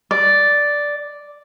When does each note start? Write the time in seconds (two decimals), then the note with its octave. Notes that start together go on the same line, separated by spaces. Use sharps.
0.11 D5